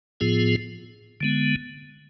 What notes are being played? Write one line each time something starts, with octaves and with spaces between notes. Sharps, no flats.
A2 F3 B3 F4 G#4
D3 G#3 B3